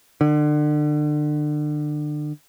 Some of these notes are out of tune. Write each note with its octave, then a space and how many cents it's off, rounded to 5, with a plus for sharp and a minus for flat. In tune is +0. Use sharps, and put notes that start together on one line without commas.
D3 +30